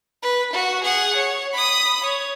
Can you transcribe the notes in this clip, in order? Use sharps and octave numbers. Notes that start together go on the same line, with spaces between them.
B4
F#4
G#4 F#5
C#5
B5 D#6
C#5